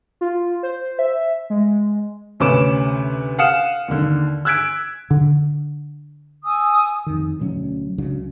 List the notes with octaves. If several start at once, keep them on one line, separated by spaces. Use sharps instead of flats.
F4
C5
E5
G#3
D2 C3 C#4 B4 D6 E7
F5 F#5 D#6 F6 C#7 E7
D#2 D3
E6 F#6 G#6 B6 D7
D3
G#5 D#6 E6
F2 D#3
D2 B2 F#3 C#4
C#2 C#3 F#3 D4